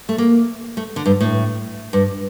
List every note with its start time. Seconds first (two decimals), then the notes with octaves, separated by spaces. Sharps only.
0.09 A3
0.18 A#3
0.77 A3
0.96 D3
1.06 G2
1.21 A2
1.93 G2